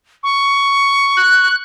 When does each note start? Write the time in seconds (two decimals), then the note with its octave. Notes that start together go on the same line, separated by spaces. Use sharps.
0.23 C#6
1.16 F#6